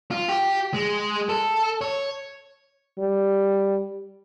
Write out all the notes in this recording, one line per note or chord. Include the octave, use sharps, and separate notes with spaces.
F4
G4
G#3
A4
C#5
G3